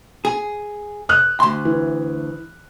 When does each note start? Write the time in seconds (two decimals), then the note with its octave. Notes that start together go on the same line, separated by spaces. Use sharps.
0.25 G#4
1.09 D#6 F6 F#6
1.40 D2 C6
1.65 E3